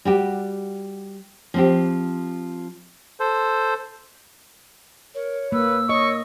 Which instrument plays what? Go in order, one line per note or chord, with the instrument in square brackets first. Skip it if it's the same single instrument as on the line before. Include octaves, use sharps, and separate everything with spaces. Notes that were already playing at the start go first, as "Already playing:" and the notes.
[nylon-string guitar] G3 F#4 G4
F3 C4 G4
[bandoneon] A4 C5
[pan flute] A#4 [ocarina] C#5
[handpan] A#3 [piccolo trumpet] B4 [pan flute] E6
[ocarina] C#5 [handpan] D#5 [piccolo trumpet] C#6